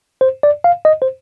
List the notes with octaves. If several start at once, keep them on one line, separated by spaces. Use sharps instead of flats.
C5
D5
F5
D#5
C5